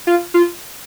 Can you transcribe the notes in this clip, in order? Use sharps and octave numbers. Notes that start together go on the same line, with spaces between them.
F4
F4